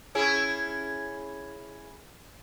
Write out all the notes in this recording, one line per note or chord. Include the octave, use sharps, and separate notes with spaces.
C#4 E4 G#4